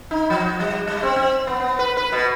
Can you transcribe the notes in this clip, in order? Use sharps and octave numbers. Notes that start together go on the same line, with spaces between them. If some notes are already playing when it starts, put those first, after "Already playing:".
D#4
F3
G3
G3
C4
C4
B3
B3
B4
B4
B2